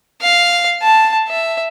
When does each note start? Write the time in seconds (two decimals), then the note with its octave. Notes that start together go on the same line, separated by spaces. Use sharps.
0.21 F5
0.83 A5
1.28 E5